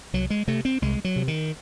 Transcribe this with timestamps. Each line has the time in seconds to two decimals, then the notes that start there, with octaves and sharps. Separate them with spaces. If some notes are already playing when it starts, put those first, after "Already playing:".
0.13 C2 F#3
0.30 G#3
0.48 C3 A3
0.65 C4
0.82 C2 G#3
1.05 F#3
1.16 C3
1.28 D#3